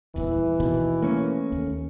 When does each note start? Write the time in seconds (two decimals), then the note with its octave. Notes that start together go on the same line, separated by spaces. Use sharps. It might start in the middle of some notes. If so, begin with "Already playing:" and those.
0.16 D#1 E2 E3
0.60 D#2 B2 D#3
1.02 A3 A#3 C#4
1.52 D#2